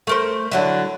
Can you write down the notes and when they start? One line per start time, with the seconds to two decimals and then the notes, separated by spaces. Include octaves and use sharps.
0.07 A3 A#4 C5
0.51 D3 F#3 E4